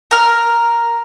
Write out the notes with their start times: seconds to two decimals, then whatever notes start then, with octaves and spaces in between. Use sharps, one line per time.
0.11 A#4 F6